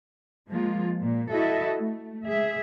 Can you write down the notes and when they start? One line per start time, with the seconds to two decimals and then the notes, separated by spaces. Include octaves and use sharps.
0.48 F3 G#3 A#3 F4
0.98 A#2
1.31 E4 F#4 A4 D#5 E5
1.77 A3
2.25 G#3 G#4 E5